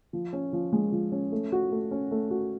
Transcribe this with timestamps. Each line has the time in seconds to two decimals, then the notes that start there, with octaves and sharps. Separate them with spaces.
0.13 F3
0.33 C#4
0.53 F3
0.73 G#3
0.92 F3
1.12 C#4
1.32 A3
1.52 F#4
1.72 A3
1.91 C#4
2.11 A3
2.31 F#4